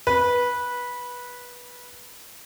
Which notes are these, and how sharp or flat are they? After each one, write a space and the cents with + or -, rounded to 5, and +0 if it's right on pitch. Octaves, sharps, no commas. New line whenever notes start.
B4 -15